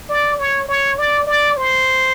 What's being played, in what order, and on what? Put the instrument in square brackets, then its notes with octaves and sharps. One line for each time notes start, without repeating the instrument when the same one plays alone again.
[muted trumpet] D5
C#5
C#5
D5
D5
C5